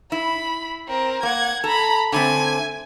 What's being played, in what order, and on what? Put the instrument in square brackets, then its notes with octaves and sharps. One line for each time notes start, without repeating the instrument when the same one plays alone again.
[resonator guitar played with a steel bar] E4 [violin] B5
[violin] C4 A#4
[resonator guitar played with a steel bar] A#3 [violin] F#5 G#6
[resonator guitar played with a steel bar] A4 [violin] A#5 B5
[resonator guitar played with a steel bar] D3 A3 C4 [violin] G#5